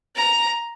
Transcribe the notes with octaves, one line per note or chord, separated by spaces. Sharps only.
A#5